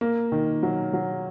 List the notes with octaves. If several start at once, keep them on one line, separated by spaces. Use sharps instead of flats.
A#3
D#3
F#3
F#3